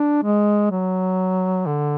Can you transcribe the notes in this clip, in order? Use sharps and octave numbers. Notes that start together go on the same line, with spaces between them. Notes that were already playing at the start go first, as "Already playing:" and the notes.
Already playing: D4
G#3
F#3
D3